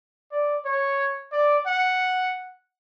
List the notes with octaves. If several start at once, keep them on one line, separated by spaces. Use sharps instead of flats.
D5
C#5
D5
F#5